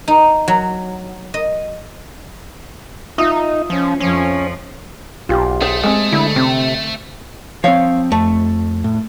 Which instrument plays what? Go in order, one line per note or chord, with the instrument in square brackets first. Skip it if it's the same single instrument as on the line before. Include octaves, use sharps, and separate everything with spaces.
[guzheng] D#4
F#3
D#5
[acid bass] D#4 [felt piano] F4 E5 D#6
[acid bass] F3 [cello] C#4
[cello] F2 F3 [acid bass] C#4
[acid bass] B1 [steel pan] F4 G4
[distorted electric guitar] A3 [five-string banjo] G#4 C5
[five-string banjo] G#3 C4
[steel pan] D3 [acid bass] E4
[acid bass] C3 [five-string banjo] C4
[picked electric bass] F3 C4 [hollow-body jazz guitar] C#5 F5
[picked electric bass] F2 [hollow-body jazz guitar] A3
[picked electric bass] A2